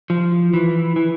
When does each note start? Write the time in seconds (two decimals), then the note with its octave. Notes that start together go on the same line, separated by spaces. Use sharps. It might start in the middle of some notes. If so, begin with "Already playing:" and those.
0.10 F3
0.54 E3
0.96 E3